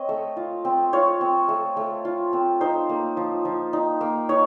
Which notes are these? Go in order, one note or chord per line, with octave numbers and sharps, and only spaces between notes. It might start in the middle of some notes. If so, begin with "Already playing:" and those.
Already playing: C4 C#5 D#5
A3
F4
C4
F4 C#5
C4
A3
A3
F4
C4
D#4 C5
A#3
F3
F3
D#4
A#3
D#4 C#5